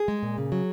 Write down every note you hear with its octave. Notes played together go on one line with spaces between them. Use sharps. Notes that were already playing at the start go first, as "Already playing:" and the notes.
Already playing: G#4
G#3
A#2
C#3
F#3